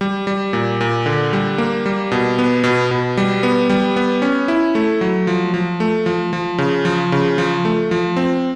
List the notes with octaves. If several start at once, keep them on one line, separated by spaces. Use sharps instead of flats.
G3
G3
A#2
A#2
D3
G3
A#3
G3
B2
B3
B2
B2
G3
B3
G3
B3
C#4
E4
A3
F#3
F3
F3
A3
F3
F3
C#3
F3
C#3
F3
A3
F3
C4